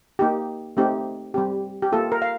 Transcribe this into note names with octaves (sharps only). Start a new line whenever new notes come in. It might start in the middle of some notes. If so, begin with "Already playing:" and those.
A#3 D#4 G4
A3 C4 D#4 G4
G3 C4 G4
G4
A#3 F4 A4
A#4
F5